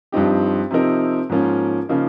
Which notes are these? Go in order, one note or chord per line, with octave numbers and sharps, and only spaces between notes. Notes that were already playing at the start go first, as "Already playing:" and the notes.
G2 F3 C4 D#4 G4
C3 F3 C4 D#4 A#4
G#2 F3 A#3 C#4 F4
C#3 F3 A#3 D#4